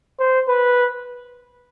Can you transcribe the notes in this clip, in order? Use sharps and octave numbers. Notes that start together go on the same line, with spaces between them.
C5
B4